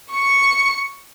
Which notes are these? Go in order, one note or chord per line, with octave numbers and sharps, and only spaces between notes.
C#6 C#7